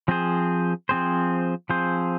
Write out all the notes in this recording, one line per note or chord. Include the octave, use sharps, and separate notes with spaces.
F3 C4 G#4 C5
F3 C4 G#4 C5
F3 C4 G#4 C5